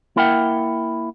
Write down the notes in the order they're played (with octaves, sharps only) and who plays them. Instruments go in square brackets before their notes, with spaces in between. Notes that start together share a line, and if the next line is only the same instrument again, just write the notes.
[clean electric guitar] A#3 E4 A#4 E5 F#5 G5